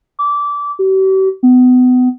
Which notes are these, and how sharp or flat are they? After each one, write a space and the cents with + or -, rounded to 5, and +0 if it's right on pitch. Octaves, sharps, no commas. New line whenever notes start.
D6 -20
G4 -45
B3 +30